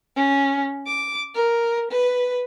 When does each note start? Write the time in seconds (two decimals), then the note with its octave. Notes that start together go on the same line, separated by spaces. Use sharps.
0.16 C#4
0.86 D6
1.33 A#4
1.90 B4